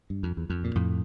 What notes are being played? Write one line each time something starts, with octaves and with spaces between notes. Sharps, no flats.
G2
F2
E2
F2
A#2
F2 A2